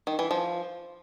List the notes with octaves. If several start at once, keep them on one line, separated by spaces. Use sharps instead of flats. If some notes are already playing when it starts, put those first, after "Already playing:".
D#3
E3
F3